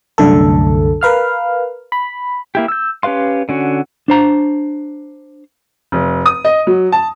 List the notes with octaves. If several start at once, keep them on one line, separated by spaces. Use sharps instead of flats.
C2 F#2 D3 A3 A4
A#4 B4 F5 F6
B5
A#3 E4 G4
E6 G6
C#4 G4 B4 F5 C6
D3 C#4 F#4
D4 C5 A#5
F1
D#6
D#5
F#3
A5